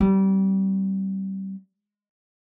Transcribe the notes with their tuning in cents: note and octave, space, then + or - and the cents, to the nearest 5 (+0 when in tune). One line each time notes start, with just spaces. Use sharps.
G3 -30 C4 -10